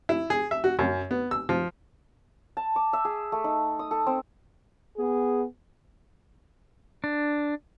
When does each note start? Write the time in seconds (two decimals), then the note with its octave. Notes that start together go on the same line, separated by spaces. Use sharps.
0.09 E4
0.30 G#4
0.51 E5
0.64 F#4
0.79 F#2
1.11 B3
1.31 E6
1.49 F3
2.57 A5
2.76 D6
2.93 E5
3.05 G#4
3.32 A3
3.44 D#4
3.79 D#6
3.91 A4
4.06 C4
4.97 B3 G#4
7.04 D4